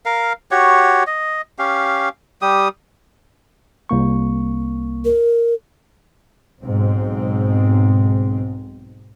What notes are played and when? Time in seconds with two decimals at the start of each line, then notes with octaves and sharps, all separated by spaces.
0.06 A#4 F5
0.51 F#4 G4 C#5
1.07 D#5
1.59 C#4 G4 F5
2.42 G3 G4 D#6
3.89 C2 A#3 C#6
5.05 A#4
6.61 B1 G#2 C4